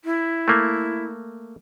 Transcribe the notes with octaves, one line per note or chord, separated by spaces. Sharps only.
E4
A3 A#3